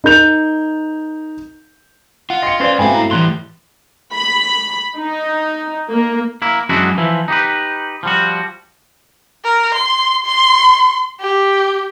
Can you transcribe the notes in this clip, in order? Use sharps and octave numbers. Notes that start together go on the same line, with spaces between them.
D#4 A#4 G6 F7
F4 F#5
D#5 G5 C6 C#7
C#4 B4 C5 D5 C6
G#2 B2 A3 C4 F5 G5 G#5 B5
E4 A#5
A2 E3 G3 C6 F#6
B5
D#4
A#3
A#3 E4
F#2 G#3 D4 E4 F#4
E3 F3 E4
D#4 G4 B4
F3 G3 F#4
A#4
C6
C6
G4